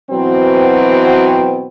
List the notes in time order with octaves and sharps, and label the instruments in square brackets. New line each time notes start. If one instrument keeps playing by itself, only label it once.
[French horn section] B2 E3 F#3 C4